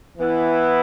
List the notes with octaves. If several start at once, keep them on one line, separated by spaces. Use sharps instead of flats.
E3 B3 E4